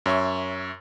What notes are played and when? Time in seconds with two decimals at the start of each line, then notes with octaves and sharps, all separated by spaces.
0.06 F#2 C#5 E5 C#6